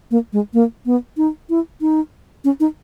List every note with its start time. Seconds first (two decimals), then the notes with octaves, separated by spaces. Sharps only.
0.11 A#3
0.33 G#3
0.54 A#3
0.86 B3
1.17 D#4
1.50 E4
1.81 D#4
2.44 C#4
2.60 D#4